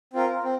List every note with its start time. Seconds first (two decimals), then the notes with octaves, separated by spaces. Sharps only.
0.13 C4 F4 A#4
0.44 C4